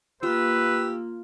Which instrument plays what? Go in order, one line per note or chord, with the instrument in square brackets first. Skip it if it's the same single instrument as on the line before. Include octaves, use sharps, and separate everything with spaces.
[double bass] A#3 [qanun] F4 [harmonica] G4 E6 [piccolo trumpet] B4